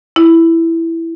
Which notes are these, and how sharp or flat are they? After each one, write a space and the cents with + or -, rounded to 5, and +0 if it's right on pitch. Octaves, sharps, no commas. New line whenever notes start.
E4 +5